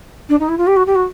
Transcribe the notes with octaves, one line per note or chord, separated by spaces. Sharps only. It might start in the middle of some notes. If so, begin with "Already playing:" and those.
D4
D#4
E4
F4
G4
F#4
G4
F#4